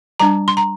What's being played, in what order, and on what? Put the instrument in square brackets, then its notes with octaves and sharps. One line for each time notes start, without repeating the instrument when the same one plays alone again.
[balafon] G3 D4 A#5
C6
A#5